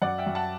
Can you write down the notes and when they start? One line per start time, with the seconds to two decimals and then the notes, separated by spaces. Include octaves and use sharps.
0.02 F#2 D5 F#5
0.18 E5 G5
0.27 F#2
0.35 F#5 A5